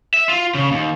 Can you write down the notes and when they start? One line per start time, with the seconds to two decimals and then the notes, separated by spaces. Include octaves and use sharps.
0.14 E5
0.29 F4
0.55 C#3
0.72 D#2